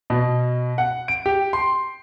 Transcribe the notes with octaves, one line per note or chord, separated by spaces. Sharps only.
B2
F#5
D7
G4
C6